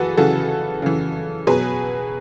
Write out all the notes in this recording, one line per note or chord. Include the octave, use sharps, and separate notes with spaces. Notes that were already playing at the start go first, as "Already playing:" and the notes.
Already playing: E3 F#4 G#4 A4 B4
C#3 E3 F#4 A4
C#3 E3
B2 F#3 G#4 B4